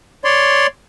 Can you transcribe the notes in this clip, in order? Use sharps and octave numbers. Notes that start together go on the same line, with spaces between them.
C#5 D5 C6